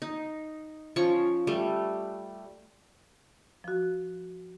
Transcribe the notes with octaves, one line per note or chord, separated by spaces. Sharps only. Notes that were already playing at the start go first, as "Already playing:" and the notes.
D#4
F3 C#4 C#6
G3 A3
F3 F#4